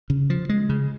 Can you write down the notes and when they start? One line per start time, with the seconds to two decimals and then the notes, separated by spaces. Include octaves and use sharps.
0.10 C#3
0.30 F3
0.49 G#3
0.69 C#3